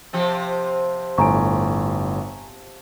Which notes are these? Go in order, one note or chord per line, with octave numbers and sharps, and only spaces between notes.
C3 F3 G4
G1 A2 G#5 A#5 C#6 D7